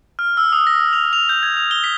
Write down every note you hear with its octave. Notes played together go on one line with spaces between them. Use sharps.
F6
E6
D#6
A#6
F7
F7
G6
G#6
F7
G7
B6